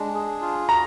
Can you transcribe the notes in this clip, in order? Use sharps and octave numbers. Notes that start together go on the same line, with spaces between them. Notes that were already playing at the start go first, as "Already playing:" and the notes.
Already playing: G#3 D4
G#4
F4
F#4 A#5